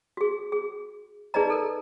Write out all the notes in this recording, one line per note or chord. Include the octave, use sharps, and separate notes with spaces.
F#4 G#4
G#4
D#4 G#4 B4 D5 D#5 A#5
A4 A#4